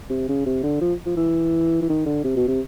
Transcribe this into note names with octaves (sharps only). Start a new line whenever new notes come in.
C3
C#3
C3
D3
F3
F3
E3
E3
D#3
D3
C3
B2
C3